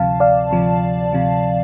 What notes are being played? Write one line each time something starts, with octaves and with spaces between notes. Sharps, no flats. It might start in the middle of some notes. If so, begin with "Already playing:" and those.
Already playing: D2 C3 F3 F5 A5
D5 F5
D2 C3 F3
D2 C3 F3